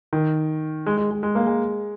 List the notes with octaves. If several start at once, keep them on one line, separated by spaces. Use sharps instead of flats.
D#3
G#3
G#3
G#3
G#3
A#3
G#3